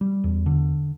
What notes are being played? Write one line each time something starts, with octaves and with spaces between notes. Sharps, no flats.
G3
E2
D3